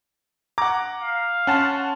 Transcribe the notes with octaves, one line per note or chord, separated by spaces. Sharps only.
F#5 A#5 D6
F5
C#4 F#5 A5 C6